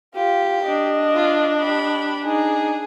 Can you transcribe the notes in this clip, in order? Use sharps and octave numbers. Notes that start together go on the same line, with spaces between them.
F4 G4
D4 D#5
F4
G4 B5
D#4 G#4